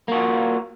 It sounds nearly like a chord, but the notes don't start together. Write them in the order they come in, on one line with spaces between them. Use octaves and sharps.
A#3 F#4 F4